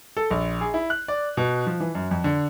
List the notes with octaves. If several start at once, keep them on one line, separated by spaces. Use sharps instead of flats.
A4
A#1
G#4
E4
F#6
D5
B2
F3
E3
F#2
F2
D3